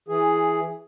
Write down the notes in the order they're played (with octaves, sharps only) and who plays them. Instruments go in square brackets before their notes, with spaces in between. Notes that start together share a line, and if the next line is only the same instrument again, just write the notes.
[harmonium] E3 G#4